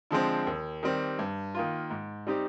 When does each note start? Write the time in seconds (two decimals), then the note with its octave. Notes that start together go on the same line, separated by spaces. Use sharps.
0.11 D3 F3 G#3 C4
0.47 D#2
0.83 D#3 G3 C4 G4
1.19 G2
1.55 D#3 A#3 F4
1.90 G#2
2.27 G3 C4 D#4 G4